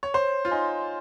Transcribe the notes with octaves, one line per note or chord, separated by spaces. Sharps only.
C#5
C5 C#5
F4
D#4 G#5 C6